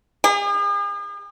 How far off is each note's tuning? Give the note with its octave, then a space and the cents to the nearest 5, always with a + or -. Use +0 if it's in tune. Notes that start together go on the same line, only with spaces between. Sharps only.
G#4 -45